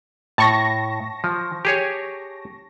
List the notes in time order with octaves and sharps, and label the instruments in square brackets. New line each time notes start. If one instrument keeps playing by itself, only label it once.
[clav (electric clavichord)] A2 [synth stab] A5 C#6 A#6
[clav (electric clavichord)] F3
G4 G#4 C#5